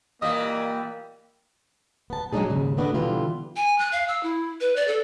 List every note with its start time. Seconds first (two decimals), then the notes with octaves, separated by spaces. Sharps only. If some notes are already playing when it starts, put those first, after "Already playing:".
0.22 A#2 E3 G3 A#3 D#5 F5 D#6
2.10 B3 A5
2.33 F#3 G#3 C4 D4 D#4 G#4
2.50 D#2 G#2 C#3
2.77 A3 B3 D4 F#4 B4 D#5
2.94 B2 D3 E3 G3 F4
3.56 G#5
3.78 F#6
3.92 F5
4.08 E6
4.23 E4
4.61 B4
4.76 D5
4.88 A4